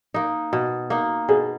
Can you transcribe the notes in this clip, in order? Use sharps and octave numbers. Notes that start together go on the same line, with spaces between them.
A#3 D#4
B2
A#3 D#4
B2 G#4